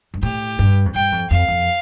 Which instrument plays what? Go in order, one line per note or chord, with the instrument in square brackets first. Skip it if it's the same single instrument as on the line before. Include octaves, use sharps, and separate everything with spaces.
[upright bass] G2
[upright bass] A2 [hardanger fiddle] G4
[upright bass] G2
F2
[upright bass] G2 [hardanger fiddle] G5
[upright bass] F2
[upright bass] F2 [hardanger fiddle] F5
[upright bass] F2